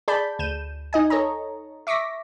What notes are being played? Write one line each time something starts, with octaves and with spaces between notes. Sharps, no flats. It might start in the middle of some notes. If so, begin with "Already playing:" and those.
G#4 D5 A5 B5 G6
D2 G6 D#7 E7
D#4 D#5 G#5
A4 C#5 D#5 A#5
E5 C#6 D6 A#6 B6